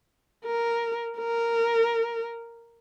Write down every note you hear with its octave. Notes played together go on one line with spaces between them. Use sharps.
A#4
A#4